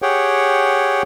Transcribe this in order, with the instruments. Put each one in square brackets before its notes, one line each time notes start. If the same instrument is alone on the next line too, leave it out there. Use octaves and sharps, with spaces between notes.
[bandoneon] G4 G#4 C#5 F#5 G5